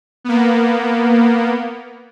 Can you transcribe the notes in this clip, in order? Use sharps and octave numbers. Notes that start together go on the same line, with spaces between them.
A#3 B3